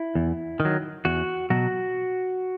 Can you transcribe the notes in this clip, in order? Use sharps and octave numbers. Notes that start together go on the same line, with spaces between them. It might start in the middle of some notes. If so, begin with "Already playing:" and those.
Already playing: E4
E2
D#3
F#3
E2 F#4
B2 F#3 F#4